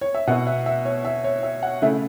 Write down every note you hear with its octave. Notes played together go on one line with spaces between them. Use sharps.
C#5
E5
B2 B3 E4 F#5
E5
E5
C#5
E5
C#5
E5
F#5
C#3 A3 E4